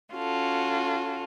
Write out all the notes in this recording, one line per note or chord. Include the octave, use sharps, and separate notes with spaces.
C#4 F4 F#4 A4